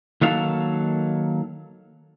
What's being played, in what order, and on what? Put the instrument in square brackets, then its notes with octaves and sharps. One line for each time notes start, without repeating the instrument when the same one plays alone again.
[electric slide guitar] D#3 F#3 A#3 A4 F5